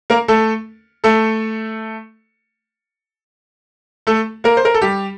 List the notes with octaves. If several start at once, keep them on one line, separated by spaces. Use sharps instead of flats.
A#3 A#4
A3 A4
A3 A4
A3 A4
A#3 A#4
C5
A#4
A4
G3 G4